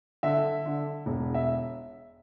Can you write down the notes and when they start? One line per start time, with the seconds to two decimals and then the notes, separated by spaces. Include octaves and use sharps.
0.23 D3 E5
0.65 D3
1.06 E1
1.34 E5